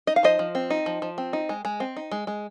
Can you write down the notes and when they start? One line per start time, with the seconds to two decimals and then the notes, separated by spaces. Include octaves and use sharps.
0.07 D#4 D#5
0.16 F5
0.23 F3 C5 D#5
0.39 F3
0.55 C4
0.70 D#4
0.86 F3
1.02 F3
1.18 C4
1.33 D#4
1.49 G#3
1.65 G#3
1.80 C4
1.97 D#4
2.12 G#3
2.27 G#3